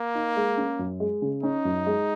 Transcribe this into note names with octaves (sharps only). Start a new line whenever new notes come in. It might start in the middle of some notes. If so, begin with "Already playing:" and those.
Already playing: A#3
D#4
G#3
C#4
F#2
G#3
C#3
C#4 D#4
F#2
G#3